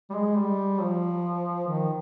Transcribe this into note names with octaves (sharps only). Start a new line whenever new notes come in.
G3
G#3
G3
F3
D#3